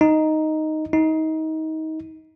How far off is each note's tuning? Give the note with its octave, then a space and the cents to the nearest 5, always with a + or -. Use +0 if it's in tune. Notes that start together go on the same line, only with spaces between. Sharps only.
D#4 +0
D#4 +25